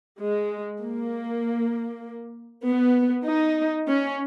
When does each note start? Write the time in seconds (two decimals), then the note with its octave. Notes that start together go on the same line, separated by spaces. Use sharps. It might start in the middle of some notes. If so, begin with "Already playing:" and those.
0.21 G#3
0.83 A#3
2.66 B3
3.27 D#4
3.88 C#4